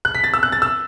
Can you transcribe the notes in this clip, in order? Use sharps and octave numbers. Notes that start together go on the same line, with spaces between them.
F#6
B6
A6
E6
F#6
A6
E6